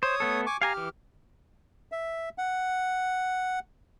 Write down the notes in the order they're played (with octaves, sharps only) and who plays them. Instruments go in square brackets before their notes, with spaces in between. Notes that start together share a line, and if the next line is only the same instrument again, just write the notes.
[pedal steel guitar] C5 [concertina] C#5 D#6
[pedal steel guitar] A3 B3 A4
[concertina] G#5 C#6 D6
[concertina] G4 F6 [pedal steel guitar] F5 G#5 A#5
[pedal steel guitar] E3
[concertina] E5
F#5